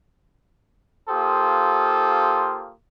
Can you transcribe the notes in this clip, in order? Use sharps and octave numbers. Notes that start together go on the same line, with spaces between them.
A#3 F4 G4 A4 C5 D#6